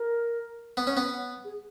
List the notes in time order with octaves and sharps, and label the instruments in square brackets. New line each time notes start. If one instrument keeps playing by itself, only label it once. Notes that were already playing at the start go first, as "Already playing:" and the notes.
Already playing: [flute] A#4
[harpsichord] B3
C#4
B3
[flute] G#4